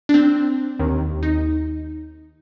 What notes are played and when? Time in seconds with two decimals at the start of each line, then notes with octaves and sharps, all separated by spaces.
0.09 D4
0.14 C4
0.79 D#2 D#3
1.23 D#4